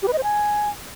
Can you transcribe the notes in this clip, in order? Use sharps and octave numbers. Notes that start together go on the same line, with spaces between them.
G4
B4
D#5
C5
G#5